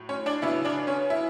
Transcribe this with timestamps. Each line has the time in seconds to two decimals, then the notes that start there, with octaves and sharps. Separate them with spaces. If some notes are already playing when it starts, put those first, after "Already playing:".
Already playing: A2 F#3
0.09 C#4 C#5
0.26 D4 D5
0.42 C#3 F#3 B3 E4 E5
0.65 D4 D5
0.87 C#4 C#5
1.10 E4 E5